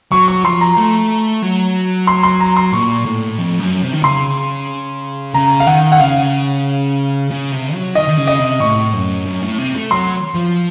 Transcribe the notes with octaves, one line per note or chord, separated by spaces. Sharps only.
F#3 C#6
C#6
F3 C6
A#5
A3
F#3
C6
C6
A#5
C6
A#2 C#6
A2
F2
F#2
C3
D#3
C#3 C6
C#3 A#5
F5
D#3 F#5
F#5
C#3 F5
C#3
C3
F#3
D#3 D#5
D#3
C#3
D#5
C3
A2 C#6
F#2
F#2
A2
C3
A3
F#3 C6
F3